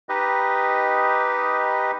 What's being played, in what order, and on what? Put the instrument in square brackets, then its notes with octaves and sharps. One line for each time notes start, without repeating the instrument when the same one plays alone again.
[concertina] D#4 G4 B4 D#5